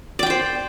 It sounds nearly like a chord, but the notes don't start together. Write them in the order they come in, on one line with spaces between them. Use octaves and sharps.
D5 G5 C6 C5